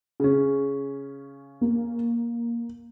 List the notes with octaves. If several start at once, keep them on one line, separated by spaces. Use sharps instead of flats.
C#3 C#4
A#3